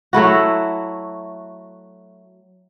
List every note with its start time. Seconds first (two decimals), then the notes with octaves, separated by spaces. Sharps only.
0.13 F#3 A3 E4 F#4